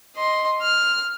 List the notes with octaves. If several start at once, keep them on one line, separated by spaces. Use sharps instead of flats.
D#5 C6
F6